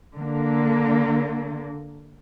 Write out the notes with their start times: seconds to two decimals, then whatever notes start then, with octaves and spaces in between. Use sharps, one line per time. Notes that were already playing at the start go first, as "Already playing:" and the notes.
0.15 D3 A#3